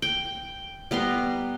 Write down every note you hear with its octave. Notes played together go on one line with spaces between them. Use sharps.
G5
G3 B3 A#5 C6